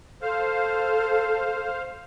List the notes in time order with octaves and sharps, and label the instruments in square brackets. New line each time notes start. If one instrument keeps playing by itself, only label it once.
[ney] A4 [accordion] C5 F5